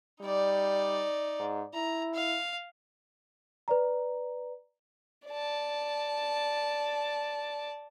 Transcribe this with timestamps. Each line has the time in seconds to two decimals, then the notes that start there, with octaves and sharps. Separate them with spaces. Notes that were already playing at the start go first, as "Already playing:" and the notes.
0.21 G3 D#4 D5
1.40 G#2
1.74 E4 A#5
2.14 F5
3.68 B4 D5 A#5
5.27 D5 A5